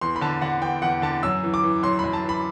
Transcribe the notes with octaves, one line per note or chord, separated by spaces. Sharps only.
E2 C6
B5
D3 A5
D3 F#5
E2 G5
E2 F#5
D3 A5
F#2 E6
E3
D6
E3
F#2 C6
F#2 B5
A5
E3 B5